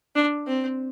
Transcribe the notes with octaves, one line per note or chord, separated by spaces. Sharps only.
D4
C4